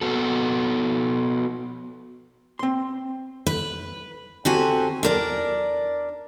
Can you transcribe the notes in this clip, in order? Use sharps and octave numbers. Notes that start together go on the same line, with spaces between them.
B3 F#4 A4
C4 C6
B4
D3 C4 F#4 G4 G#5
D4 A#4 D5